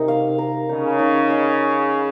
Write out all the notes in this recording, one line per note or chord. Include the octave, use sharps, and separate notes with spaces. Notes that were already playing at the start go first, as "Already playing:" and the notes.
Already playing: C3 D#4 A#4
F5
A#4
C#3 D#4
D#4
D#5